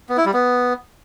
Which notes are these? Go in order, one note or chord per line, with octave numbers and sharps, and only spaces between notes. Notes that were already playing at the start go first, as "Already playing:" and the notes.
B3
E4
G3
B3